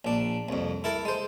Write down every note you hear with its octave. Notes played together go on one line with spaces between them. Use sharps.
A#1 D4
C2 F2
E4 A4 A#4
G#3 C5